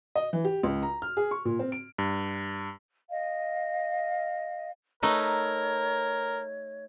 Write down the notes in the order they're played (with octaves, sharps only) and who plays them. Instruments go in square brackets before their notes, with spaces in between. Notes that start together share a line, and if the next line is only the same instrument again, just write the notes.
[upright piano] D#5
E3
G4
C#2
A#5
F6
G#4
C#6
A#2
C4
D7
[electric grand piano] G2
[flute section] D#5 F5
[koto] A3 D#4 B4 [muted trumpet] A#4 [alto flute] C#5